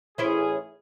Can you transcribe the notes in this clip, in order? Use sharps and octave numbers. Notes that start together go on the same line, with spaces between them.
A1 C#4 E4 G#4 C5